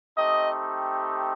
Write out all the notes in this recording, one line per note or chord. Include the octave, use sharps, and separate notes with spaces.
A3 C4 D#4 G4 D#5